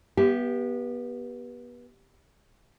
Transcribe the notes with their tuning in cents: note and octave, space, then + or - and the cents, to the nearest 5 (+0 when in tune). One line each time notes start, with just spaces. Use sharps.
B3 -25 G4 +0 E5 +25